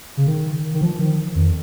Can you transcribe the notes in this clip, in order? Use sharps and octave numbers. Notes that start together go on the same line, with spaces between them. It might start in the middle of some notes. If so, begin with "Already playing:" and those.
C#3
D#3
D#3
F3
D#3
F2